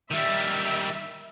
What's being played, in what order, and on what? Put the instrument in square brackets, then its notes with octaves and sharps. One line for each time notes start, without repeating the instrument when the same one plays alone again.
[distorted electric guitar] D#3 G3 [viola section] E5